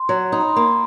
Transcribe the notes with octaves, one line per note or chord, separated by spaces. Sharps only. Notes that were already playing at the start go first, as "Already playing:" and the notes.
Already playing: C6
F#3
D#4 C6
B5
C6
A#3